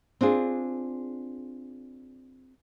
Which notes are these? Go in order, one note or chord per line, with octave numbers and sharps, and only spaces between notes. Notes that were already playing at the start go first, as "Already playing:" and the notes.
C4 D4 F4 G#4